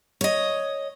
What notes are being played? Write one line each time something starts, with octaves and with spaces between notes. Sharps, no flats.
C#5 D#5